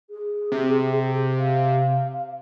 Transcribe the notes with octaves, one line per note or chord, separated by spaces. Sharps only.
G#4
C3
F5